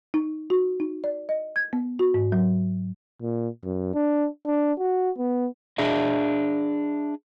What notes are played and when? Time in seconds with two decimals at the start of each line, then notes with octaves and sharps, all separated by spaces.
0.14 D#4
0.50 F#4
0.80 D#4
1.04 D5
1.29 D#5
1.56 G#6
1.73 B3
1.99 F#4
2.14 G#2
2.32 F#3
3.22 A#2
3.64 F#2
3.95 D4
4.46 D4
4.79 F#4
5.18 B3
5.78 D4 G#4 D#5 E5